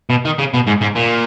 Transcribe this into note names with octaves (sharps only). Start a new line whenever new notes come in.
B2
D#3
C#3
B2
G#2
G#2
A#2